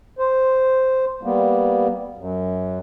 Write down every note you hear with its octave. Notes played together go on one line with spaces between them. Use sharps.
C5
G3 A#3 B3
F#2